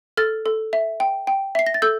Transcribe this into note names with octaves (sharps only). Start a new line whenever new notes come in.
A4 F6 A6
A4
E5
G5
G5
E5 C7
A#6
A6
A4 E6 G6